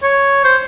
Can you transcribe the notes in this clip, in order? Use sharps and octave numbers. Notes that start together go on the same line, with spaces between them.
C#5
C5